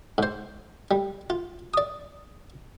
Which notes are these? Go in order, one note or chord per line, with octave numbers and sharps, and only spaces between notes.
G#2 C5
G3
F4
D5 D#6